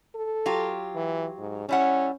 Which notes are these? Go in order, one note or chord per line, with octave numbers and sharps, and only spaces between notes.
A4
F#3 F4 G4
E3
G#2
G3 C#4 E4 F#5